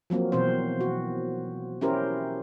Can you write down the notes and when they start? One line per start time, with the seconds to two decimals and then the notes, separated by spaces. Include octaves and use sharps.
0.10 F3 F#3 A#3 C4
0.32 B2 E3 C4 C5
0.81 F#4
1.81 C#4 E4 G4 A#4 C5